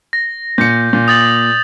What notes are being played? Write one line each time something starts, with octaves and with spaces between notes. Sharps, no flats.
A#6
A#2 G6 C#7
A#2
D#6 A6 F#7